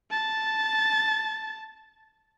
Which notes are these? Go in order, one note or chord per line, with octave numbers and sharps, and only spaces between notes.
A5 A6